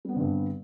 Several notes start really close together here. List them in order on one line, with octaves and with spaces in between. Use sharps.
G3 B3 C4 D3 G2